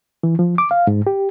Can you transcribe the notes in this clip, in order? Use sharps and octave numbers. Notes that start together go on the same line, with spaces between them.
E3
F3
D6
F5
G#2
G4